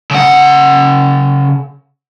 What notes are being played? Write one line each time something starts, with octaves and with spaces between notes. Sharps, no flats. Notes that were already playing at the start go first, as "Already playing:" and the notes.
C#3 F#5